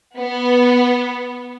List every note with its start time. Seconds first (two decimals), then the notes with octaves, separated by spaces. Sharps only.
0.17 B3